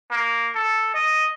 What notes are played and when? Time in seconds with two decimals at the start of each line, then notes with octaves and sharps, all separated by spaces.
0.11 A#3
0.55 A4
0.95 D#5